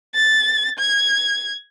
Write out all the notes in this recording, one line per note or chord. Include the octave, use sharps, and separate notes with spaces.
A6
G#6